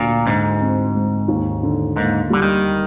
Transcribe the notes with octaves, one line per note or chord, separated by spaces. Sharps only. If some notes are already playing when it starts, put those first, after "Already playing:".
Already playing: D2 A#2
G#2 D3
C4
G#3
D#2
D3
G#2 A#3
D3 G3
D#3